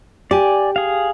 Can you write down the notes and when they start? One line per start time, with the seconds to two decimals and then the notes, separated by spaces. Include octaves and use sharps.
0.31 G4 D5 G#5
0.76 G#4 F5